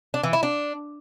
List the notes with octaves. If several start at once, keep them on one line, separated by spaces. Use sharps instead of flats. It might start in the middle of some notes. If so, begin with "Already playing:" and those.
D4
E3
E4
D4